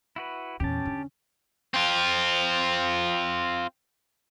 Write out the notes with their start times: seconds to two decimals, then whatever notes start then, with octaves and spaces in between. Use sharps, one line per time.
0.16 E4 F#4 B4
0.60 E2 A#2 C#4 G4 A5
0.85 D3
1.74 C4 F4